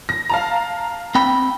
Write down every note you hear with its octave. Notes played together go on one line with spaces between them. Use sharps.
A#6
F5 A5 A#5
C4 G5 B5